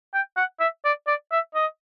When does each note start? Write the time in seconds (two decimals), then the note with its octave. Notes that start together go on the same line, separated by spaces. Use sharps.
0.14 G5
0.37 F#5
0.60 E5
0.85 D5
1.07 D5
1.32 E5
1.55 D#5